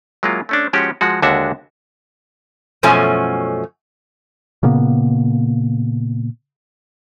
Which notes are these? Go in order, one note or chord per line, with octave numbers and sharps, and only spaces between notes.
F#3 G#3 A#3 E4 F4
A3 C#4 D4
F3 G#3 C#4 F#4 G4
F3 G#3 F#4
D#2 D3 G#3 D4 F#4 E5
F#2 B2 F3 A3 C#4 G#5
A#2 C#3 A#3 B3